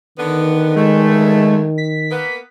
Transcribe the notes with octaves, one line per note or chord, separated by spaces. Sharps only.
D3 D#3 B3
D2 G2 G#3 A3
B6
A#3 B3